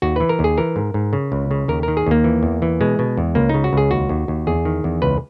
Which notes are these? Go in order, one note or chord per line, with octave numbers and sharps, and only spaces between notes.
D#2 F#4
E3 B4
A#4
D#2
G#4
E3 A#4
G#2
G#2
C#3
C#2
C#3
D#2 A#4
D#3 A#4
G#4
D#2 A#3
E3
E2
E3
B2 G#3
B2
E2
C#2 A#3
C#3 D#4
F#4
C#2 G#4
D#2 F#4
D#2
D#2
E2 G#4
D#3
E2
C#2 B4